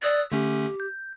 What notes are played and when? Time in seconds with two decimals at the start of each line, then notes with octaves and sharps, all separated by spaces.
0.03 D5 D#6 E6 F#6
0.32 D3 A3 C#4 G4
0.80 G6